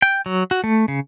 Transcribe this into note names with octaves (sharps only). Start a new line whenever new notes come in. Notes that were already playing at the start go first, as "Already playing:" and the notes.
G5
F#3
F#4
A3
C#3